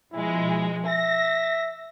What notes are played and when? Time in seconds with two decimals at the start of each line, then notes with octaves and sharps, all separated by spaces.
0.12 B2 F3 G#3 E4
0.85 E5 A#6